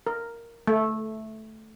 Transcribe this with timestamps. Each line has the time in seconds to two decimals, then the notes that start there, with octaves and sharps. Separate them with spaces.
0.07 A#4
0.67 A3